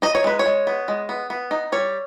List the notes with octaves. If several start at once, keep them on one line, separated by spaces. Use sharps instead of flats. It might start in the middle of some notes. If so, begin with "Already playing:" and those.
D#4 D#5
C#5
G#3 B4
C#5
G#3
B3
G#3
B3
B3
D#4
G3 C#5